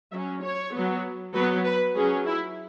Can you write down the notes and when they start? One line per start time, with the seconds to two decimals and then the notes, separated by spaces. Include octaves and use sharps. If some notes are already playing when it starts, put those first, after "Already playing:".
0.12 F#3 E5
0.17 C#4
0.43 C#5
0.74 F#3 B3
1.34 F#3 B3 B4
1.65 B4
1.95 F#3 C#4 G#4
2.26 E4